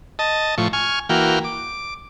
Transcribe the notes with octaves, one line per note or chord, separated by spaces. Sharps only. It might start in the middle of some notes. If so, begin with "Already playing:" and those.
D#5 A5
A2 F3 C#6
G#5 C#6 F6
E3 A#3 F#4 G5 F6
D6